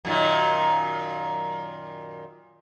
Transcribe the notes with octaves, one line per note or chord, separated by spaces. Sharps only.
F#2 A#2 D#3